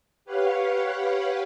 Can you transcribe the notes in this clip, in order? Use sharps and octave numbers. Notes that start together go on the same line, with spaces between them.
G4 B4 C#5 F5 F#5